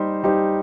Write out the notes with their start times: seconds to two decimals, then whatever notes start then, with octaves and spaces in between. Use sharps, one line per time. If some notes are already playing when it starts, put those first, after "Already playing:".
Already playing: G3 D#4 G4 C5
0.23 G3 D#4 G4 C5